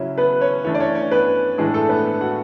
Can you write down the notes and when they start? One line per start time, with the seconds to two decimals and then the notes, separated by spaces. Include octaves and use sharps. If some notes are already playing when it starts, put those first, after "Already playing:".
Already playing: C#3 F#3 C#4 E4
0.18 B3 B4
0.41 C#4 C#5
0.65 E3 A3 C#4 D4 C#5
0.75 D5
0.80 C#4 C#5
0.95 C#4 C#5
1.11 B3 B4
1.58 A2 E3 G#3 A3 D4 G#4
1.74 A3 A4
1.89 B3 B4
2.21 F#4 F#5